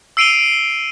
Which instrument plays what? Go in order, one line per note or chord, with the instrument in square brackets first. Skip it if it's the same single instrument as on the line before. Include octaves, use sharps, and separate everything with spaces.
[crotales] E6 C7 D7 D#7 F7 G7